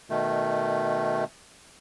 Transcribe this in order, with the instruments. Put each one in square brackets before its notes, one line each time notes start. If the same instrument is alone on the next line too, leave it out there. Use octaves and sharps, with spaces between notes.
[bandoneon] B2 D#3 A3